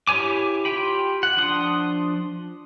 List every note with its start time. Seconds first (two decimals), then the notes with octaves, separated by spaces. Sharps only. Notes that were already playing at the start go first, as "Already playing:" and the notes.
0.07 E4 G4 C#5 G#5 D6
0.65 F4 G4 G5 B5
1.23 F#5
1.37 F3 D4 C6 D#6